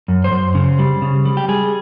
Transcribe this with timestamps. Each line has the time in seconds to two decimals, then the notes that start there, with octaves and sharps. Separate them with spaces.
0.08 F#2
0.24 C5
0.31 F#2
0.55 C#3
0.79 G3
1.02 C#3
1.25 G3
1.37 G4
1.49 G3 G#4